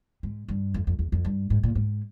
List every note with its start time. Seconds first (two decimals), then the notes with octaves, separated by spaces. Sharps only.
0.23 G#2
0.48 G2
0.74 F2
0.87 F2
0.99 E2
1.12 F2
1.25 G2
1.50 G#2
1.63 A#2
1.75 G#2